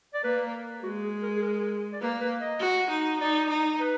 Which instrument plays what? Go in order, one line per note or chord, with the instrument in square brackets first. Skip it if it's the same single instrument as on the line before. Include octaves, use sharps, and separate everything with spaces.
[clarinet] D5
[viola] A#3 [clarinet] B4
[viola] G#3 [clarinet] F#4
[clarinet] G#4
A#4
G#4
A#4
D5
[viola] A#3 [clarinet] B4
[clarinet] B4
D#5
[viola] F#4
D#4
[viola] D#4 [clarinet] D5
[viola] D#4
[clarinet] B4